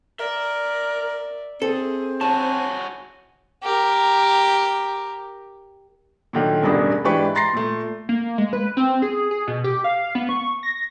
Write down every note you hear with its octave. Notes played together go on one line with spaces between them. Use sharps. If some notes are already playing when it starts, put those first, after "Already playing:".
A#4 D5 E5
C4 G#4 A4
E4 F#4 C#5 G#5 A5
G4 A#4
A#2 D3 D#3 F#3
E1 A1 E2 G2 D4 G#4
G#2 E3 D4 G4 B4 C#6
A#5 C6 A6 A#6 C7
A#2 A3
A#3
G#3
B4
C4
G#4
G#4
B2
G4
F5
B3
C#6
A#6